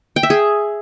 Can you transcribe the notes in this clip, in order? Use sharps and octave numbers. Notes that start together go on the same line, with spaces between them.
G5
E5
G#4